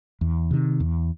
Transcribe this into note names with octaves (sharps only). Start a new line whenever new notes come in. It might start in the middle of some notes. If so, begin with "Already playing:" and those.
E2
C3 D#3
E2